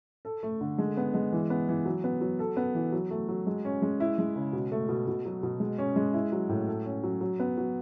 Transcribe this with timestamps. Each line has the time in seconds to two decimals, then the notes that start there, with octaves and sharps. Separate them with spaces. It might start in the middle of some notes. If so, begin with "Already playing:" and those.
0.25 A4
0.43 A3
0.61 D3
0.78 G#3
0.97 B3
1.14 G#3
1.32 E3
1.50 B3
1.69 E3
1.86 F#3
2.04 B3
2.21 F#3
2.39 A4
2.57 B3
2.75 E3
2.92 F#3
3.11 A3
3.29 F#3
3.47 G#3
3.65 C#4
3.82 G#3
4.00 E4
4.18 G#3
4.36 C#3
4.53 B2
4.72 A3
4.89 B2
5.08 B2
5.25 F#3
5.43 B2
5.60 G#3
5.78 C#4
5.96 G#3
6.13 E4
6.32 F#3
6.49 A2
6.68 A4
6.85 C#4
7.04 F#3
7.21 F#3
7.40 B3
7.57 F#3